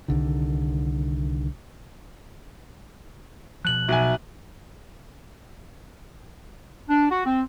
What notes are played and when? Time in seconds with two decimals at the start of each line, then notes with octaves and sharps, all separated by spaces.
0.08 C2 D3 D#3
3.65 B2 F3 F#6 F#7
3.89 B1 E5 G#5
6.89 D4
7.10 F#4
7.26 C4